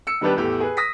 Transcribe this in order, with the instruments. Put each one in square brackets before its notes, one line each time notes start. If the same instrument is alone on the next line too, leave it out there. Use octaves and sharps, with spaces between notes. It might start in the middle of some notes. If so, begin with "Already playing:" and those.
[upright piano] E6 C#7
D#3 G3 B3 D4 G4 B4
E2 A2 G4
G#4 B4
D#6 A#6 B6